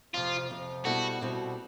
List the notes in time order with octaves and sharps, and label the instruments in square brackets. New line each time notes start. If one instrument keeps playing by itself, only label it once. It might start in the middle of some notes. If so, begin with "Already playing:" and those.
[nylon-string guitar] F2 C3 F3 [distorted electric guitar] F4
[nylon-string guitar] F2 C3 F3
[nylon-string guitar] B2 G3 C4 E4 A4 [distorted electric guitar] F#4
[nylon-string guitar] B2 G3 C4 E4 A4